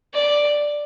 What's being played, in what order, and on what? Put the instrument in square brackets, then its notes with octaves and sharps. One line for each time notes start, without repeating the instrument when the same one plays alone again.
[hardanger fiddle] D5